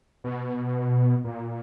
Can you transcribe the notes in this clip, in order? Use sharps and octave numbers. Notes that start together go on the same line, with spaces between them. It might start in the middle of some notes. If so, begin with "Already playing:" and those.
B2
A#2